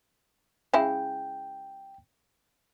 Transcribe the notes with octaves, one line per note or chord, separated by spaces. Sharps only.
C#3 G#3 E4 G5